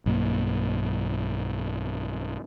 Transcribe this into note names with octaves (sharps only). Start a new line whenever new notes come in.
B1 G2 A#3